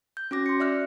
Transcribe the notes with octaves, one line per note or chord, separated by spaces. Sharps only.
G6
C#4 F#4 D6 A#6
C6 C#7
D5 E5 F6 F#6